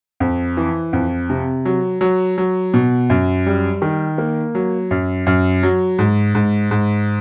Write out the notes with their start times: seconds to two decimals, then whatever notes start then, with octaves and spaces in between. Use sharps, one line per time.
0.20 F2
0.57 E3
0.93 F2
1.30 C3
1.65 F#3
2.01 F#3
2.38 F#3
2.74 B2
3.10 F#2
3.46 G3
3.82 D#3
4.18 A#3
4.55 F#3
4.91 F#2
5.27 F#2
5.63 F#3
5.98 G#2
6.35 G#2
6.71 G#2